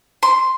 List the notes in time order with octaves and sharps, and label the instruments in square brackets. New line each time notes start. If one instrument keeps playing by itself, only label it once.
[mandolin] C6